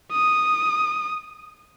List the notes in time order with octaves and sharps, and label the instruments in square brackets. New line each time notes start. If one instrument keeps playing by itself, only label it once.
[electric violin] D#6